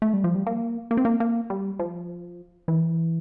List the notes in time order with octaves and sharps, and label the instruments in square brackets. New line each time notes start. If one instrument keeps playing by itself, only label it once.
[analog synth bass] A3
G3
F3
G3
A#3
A#3
C4
A#3
A#3
G3
F3
E3